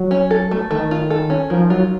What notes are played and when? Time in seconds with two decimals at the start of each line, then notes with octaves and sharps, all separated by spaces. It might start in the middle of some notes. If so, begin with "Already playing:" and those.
Already playing: F#3
0.11 C#4
0.31 A4
0.51 A3
0.71 D#3 A3
0.91 F4
1.10 A4
1.30 C#4
1.50 D#3 F3
1.70 F#3 F4